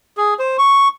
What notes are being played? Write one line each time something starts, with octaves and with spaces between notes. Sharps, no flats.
G#4
C5
C#6